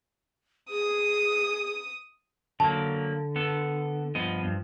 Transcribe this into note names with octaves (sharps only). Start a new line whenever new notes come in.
G#4 D#6
D3 F#3 A#3 A5
B3 A4
G2 F3 B3 D#5
G2